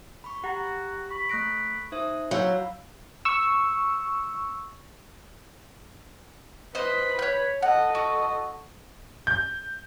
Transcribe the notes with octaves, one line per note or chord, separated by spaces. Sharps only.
B5 C#6
F#4 G4 F#5 A#5
B5 C#6
A3 C#6 F#6 A#6 D7
D#4 C5 E5 D#6
F#3 C5 F5 B5 E6
C#6 E6
B4 C5 D#5 B5
C#5 G6
A4 D#5 F#5
F#4
G6